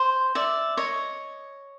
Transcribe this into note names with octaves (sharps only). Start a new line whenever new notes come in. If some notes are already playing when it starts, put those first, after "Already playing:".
Already playing: C5
D5 E5
C#5 D#5